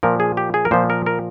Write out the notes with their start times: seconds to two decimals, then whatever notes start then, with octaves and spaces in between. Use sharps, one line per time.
0.03 A#2 F3 A#4
0.20 G#4
0.37 G4
0.54 G#4
0.65 A#4
0.71 A#2 F3 C5
0.90 A#4
1.06 A#4